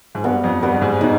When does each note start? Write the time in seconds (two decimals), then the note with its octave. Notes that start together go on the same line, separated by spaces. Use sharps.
0.15 G#2
0.24 G2 B3
0.44 F2
0.63 G2 B3
0.74 G2
0.81 G#2
1.00 B2 D#4